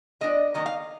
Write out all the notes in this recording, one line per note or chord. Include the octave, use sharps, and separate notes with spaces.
F3 G#3 B3 D4 D#5
D#3 F#3 A#3 D#4 D#5
F5